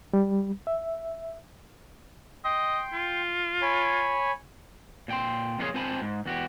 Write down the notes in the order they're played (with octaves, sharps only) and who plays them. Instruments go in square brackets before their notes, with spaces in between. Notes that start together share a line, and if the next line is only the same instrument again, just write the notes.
[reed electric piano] G3
E5
[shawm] D#5 [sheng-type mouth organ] G5 C6
[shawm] F4
[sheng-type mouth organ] C#5 G#5 B5
[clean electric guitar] A#2 G5 C6
F2 A#2 D4 F4 G#4 C#5
C4 F4 C5 G#5 A5 B5
G#2
E2 F#4 G4